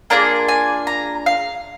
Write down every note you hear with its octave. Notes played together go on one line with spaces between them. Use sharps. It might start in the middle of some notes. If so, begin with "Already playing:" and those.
A#3 D4 F4 G#4 A#5
G#5
A#5
F5